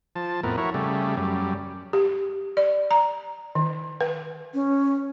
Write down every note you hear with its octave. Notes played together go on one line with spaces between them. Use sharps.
F3 A5
F2 A2 B3 A#4
E4 F#4 A#4 C#5
C#3 G3 A3
F#2 G3
G4
D5
A#5
D#3
B4
C#4